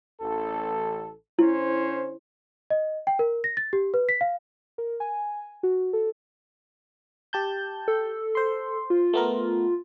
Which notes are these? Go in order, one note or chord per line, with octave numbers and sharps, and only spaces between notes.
A1 A4
D3 C#4 E4 C5
D#5
G5
A#4
A#6
A6
G4
B4
B6
F5
A#4
G#5
F#4
A4
G4 A5 G6
A4
C5 C6
F4
A3 B3 A#4